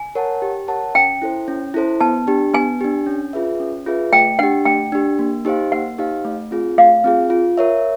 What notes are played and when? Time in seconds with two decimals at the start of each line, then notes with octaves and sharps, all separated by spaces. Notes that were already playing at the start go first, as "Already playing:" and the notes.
Already playing: G#5
0.15 A#4 C#5 F#5 A5
0.42 G4
0.68 A#4 C#5 F#5 A5
0.95 C#4 G5
1.22 E4 A4 C5
1.48 C#4
1.74 E4 A4 C5
2.00 B3 A5
2.27 D4 G4
2.54 B3 G#5
2.81 D4 G4
3.06 C#4
3.33 F4 G#4 B4 E5
3.60 C#4
3.86 F4 G#4 B4 E5
4.12 A3 G5
4.39 D4 G4 F#5
4.65 A3 G5
4.92 D4 G4
5.19 A#3
5.45 D#4 G4 C5 F5
5.72 A#3 F#5
5.98 D#4 G4 C5 F5
6.25 A3
6.51 C4 F4 G#4
6.78 A3 F5
7.04 C4 F4 G#4
7.30 F4
7.58 A#4 C#5 E5